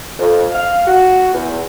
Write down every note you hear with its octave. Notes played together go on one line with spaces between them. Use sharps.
F2
F5
F#4
E2